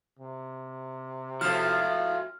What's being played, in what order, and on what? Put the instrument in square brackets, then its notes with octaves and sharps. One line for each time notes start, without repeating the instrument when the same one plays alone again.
[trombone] C3
[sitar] A2 F3 [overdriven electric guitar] F#4 E5 [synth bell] F6